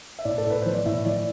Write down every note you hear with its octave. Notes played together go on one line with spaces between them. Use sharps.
E5
A2 D5
A4
A2 B4
E3 C5
D5
A2 E5
E3 D5